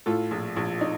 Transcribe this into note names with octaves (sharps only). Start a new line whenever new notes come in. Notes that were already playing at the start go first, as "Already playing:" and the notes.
A2 F4 A4
A#1
A#1
D#4